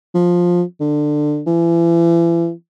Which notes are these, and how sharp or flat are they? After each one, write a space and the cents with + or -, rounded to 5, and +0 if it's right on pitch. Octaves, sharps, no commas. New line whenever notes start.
F3 +10
D3 +20
E3 +35